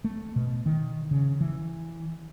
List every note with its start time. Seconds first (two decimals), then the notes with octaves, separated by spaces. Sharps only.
0.04 A3
0.36 B2
0.66 D#3
1.11 C#3
1.41 E3